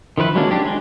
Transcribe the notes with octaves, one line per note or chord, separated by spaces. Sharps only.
D#3 F3 E4 B4
F#3 G#3 A#3 C#4 D4
D4 G4
G#3